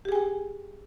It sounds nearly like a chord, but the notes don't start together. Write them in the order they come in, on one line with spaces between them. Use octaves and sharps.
G4 G#4 G#5 G5